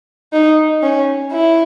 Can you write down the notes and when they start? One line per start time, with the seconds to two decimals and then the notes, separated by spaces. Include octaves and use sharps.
0.33 D#4
0.83 C#4
1.33 E4